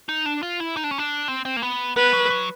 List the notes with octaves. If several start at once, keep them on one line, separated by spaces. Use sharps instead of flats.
D#4
D4
F4
E4
D#4
D4
C#4
D4
C4
C4
A#3
B3
B3 B4
F#3
F#3